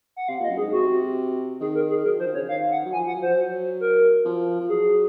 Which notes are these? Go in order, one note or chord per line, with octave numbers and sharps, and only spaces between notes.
F#5
C3 F5
A#2 D#5
F#2
G#4
G#2
C3 F#4
D#3 G#4
A#4
G#4
F#3 A#4
F3 C5
D#3
C3 C#5
C#3
D#3 F5
F#5
F#3
F3 G#5
F#5
F#3
F3 C5
F#3
A#4
F3
F3
F#3 G#4